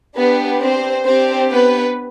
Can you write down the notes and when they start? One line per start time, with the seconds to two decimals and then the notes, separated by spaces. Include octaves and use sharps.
0.17 B3 D4 G4 B4
0.61 C4 C5
1.06 C4 D4 G4 C5
1.51 B3 B4